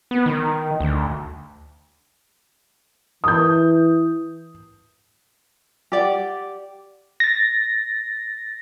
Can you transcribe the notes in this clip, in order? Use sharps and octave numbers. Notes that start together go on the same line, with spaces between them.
B3
D#3
D2
E3 D#6 G6
G4 D5 F#5
A6 A#6